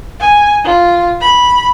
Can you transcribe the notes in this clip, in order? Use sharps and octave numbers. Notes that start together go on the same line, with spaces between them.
G#5
F4
B5